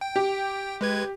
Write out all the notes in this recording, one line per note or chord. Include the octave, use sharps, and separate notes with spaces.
G5
G4
G#3 B4 G#6